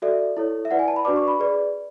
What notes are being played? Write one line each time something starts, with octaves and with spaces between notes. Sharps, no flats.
F#4 A4 D5 E5
E4 A4 C#5
E5
E4 B4 D5 F#5
G#5
A5
B5
D4 F#4 B4 D5 D6
C#6
B5
G#4 B4 D5